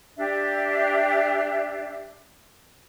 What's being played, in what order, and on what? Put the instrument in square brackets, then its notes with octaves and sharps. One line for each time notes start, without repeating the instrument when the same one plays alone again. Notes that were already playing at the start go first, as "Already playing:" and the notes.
[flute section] D4 G4 D5 E5